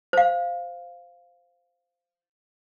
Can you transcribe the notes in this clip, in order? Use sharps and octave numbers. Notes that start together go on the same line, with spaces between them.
C5 F5